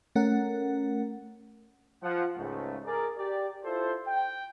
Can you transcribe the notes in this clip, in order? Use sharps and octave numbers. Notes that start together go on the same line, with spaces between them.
A3 C#4 A#4 F#5
F3 F#5
C#2 G#2 A3
G#4 A#4 D5
G4 D5
E4 F4 A4 C5
G5